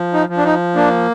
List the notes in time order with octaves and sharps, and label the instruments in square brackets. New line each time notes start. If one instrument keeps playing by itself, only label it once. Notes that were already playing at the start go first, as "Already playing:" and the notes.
Already playing: [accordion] F3
D#4
F3
D4
D#4
A#3 D4